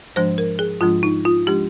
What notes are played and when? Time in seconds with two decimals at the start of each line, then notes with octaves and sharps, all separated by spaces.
0.16 G#2 F3 G#3 D4 C5
0.38 A#4
0.59 G#4
0.81 G#2 F3 G#3 D4 F4
1.03 D#4
1.25 F4
1.47 F3 G#3 D4 G4